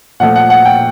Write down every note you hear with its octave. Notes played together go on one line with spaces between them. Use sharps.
A#2 F3 A3 F#5
F#5
F#5
G5